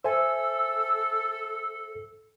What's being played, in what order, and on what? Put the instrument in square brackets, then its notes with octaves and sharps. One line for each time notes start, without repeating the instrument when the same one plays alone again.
[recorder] A4 [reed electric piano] C5 E5 G#5 [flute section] E6